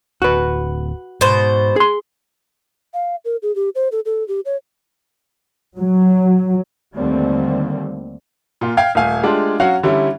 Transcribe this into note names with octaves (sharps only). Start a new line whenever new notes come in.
D1 F#4 B4
G#2 B2 C5
G#4 C6
F5
A#4
G#4
G4
C5
A4
A4
G4
C#5
F#3
D#2 D3 G3 A3 C4
A#2 F4
F5 G5 F6 G#6
D#1 A3 F5 G#5
G#3 A3 D4 F4 G4
F#3 C#4 F#4 F5 F#5
D3 G3 C#4 E4